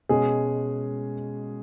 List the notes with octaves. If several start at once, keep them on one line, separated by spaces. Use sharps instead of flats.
B2 G#3 C#4 G#4